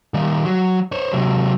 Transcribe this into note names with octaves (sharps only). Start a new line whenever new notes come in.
D#3 G3
F#3
C5 C#5
C3 F#3